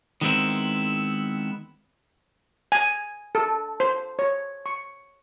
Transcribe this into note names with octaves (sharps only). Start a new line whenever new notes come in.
D#3 G#3 B3 C4 E4
G#5
A4
C5
C#5
C#6